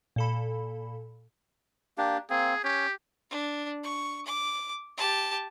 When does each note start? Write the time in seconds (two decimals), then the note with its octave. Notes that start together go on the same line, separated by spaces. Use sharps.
0.16 A#2 A4 B5
1.98 A#3 D4 G4
2.30 A#3 C4 G#4
2.64 C#4 G4 C#5
3.30 D4
3.83 C#6
4.26 D6
4.97 G4 A5